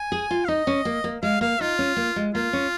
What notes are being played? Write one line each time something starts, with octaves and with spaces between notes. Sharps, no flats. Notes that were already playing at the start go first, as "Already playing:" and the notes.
Already playing: G#5
G#4
F4
F5
D#4 D#5
C#4
A#3
A#3
G#3 F5
A#3 F5
D#4 F4
C#4
A#3
G#3
A#3 F4
C#4